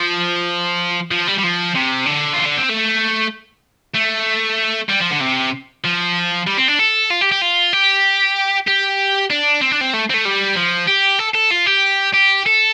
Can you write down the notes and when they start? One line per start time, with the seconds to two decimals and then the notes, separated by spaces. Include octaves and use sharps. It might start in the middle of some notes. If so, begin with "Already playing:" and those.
Already playing: F3
1.11 F3
1.27 G3
1.38 G3
1.43 F3
1.75 C3
2.06 D3
2.33 F4
2.46 D4
2.57 C4
2.70 A3
3.95 A3
4.89 G3
5.00 F3
5.11 D3
5.20 C3
5.84 F3
6.47 G3
6.57 C4
6.68 D4
6.79 A4
7.10 F4
7.21 G4
7.32 G4
7.42 F4
7.73 G4
8.68 G4
9.30 D4
9.61 C4
9.72 D4
9.81 C4
9.94 A3
10.10 C4
10.14 A3
10.25 G3
10.56 F3
10.87 G4
11.19 A4
11.35 A4
11.51 F4
11.67 G4
12.14 G4
12.46 A4